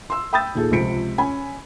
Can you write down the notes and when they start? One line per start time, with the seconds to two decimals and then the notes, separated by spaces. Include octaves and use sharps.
0.10 C6 E6
0.33 G5 B5 D#6 E6 G6 A6
0.55 D#2 A#2 G#4 A4
0.72 C#2 C3 F3 B6 C#7 D7
1.18 C#4 G#5 B5